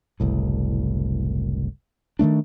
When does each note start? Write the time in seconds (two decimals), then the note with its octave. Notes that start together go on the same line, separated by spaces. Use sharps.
0.20 F#1 C2 A2
2.19 D#3 F3 A3 D4